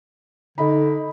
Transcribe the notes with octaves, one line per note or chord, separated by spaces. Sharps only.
D3 D#4 D#5 B5